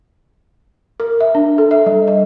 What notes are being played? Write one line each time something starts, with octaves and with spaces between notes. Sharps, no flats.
A#4
E5
D4
A4
E5
G3
D#5